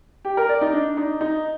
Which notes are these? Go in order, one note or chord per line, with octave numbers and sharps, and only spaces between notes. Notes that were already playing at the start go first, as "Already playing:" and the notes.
G4
A#4
D5
D#4
D4
D#4
D#4